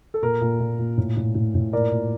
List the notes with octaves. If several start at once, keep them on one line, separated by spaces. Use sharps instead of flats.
A4
A#2 A#4
A#2
A#2
A#2
A2
A2
A2
A2
A#2 A#4 D5
A#2